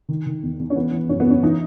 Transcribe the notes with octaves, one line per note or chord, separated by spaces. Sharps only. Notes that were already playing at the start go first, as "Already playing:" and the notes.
D#3
D#3
E2
E2
C#4
E3 B3
E3
F#2 C#4
B3
F#2 C#4
E3 D#4